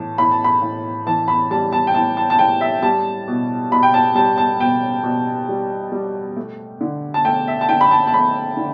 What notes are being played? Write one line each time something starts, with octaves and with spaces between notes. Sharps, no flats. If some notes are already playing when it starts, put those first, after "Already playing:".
Already playing: A2 E3 A5
A2 B5
A5
B5
A2
E3 A5
B5
G3 A5
A5
G5
A2 A5
A5
A5
A2 G5
E5
G3 A5
B2
B2 B5
G5
A5
G3 A5
A5
B2 G5
B2
G3
G3
A3
D3
A5
A3 G5
E5
A5
D3 G5
B5
A5
A5
A3 B5
D3